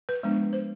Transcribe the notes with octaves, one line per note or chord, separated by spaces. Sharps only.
B4
F3 G#3 B3 D4
C5